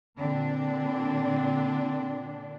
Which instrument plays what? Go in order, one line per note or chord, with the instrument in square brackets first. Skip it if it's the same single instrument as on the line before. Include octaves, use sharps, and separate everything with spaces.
[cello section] A#2 D3 D4 [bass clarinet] C4